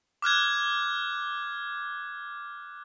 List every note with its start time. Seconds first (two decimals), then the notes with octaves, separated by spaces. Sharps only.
0.22 D6 F6 F#6 G#6